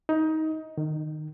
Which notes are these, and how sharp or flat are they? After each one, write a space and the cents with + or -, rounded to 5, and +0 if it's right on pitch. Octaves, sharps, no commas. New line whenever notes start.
D#4 +20
D#3 -20